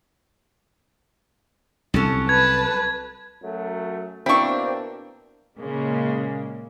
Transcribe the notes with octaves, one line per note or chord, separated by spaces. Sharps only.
C2 F#3 C#4 A4
B4 A5 G#6
F#2 F#3 A3
B2 A#3 C4 D4 E4 C#6
A#2 C#3 G#3 A#3